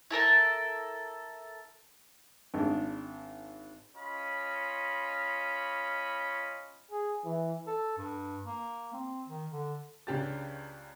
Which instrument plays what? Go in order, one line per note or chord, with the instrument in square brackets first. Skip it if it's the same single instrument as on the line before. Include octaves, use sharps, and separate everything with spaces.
[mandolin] E4 A4 A#4 A5
[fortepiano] G#1 D4
[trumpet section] C#4 F4 D#5 B5
[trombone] G#4
E3
[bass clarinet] A4
G2
A#3
C4
D#3
D3
[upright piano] C#2 C#3 D4 G4 A5 A6